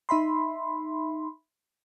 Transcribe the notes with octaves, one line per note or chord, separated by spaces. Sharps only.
D#4 E5 B5 C6